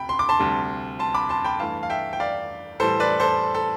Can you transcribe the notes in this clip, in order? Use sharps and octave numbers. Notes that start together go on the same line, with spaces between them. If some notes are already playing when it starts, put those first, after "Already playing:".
Already playing: D2 C3 G5 B5
C6
D6
A5 C6
D2 C3 G3
A5 C6
B5 D6
A5 C6
G5 B5
G2 E3 A3 F5 A5
F5
E5 G5
G5
D5 F5
A2 E3 G3 A4 C5
B4 D5
A4 C5
A4